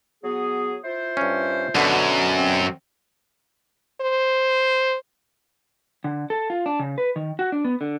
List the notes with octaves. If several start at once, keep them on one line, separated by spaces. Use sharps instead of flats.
F#3 B3 G#4
E4 F4 C5
G2 C#4
F#2 B2 D3
C4
C5
D3
A4
F4
D4
C#3
B4
D#3
F#4
D4
B3
D3